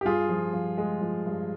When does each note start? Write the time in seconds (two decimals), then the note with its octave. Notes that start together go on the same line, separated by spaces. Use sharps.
0.01 G4
0.05 G2 F4 G#4
0.29 F3
0.53 F3
0.78 G#3
1.01 F3
1.26 G2